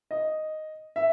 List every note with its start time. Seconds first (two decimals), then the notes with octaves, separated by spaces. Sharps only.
0.11 D#5
0.96 E5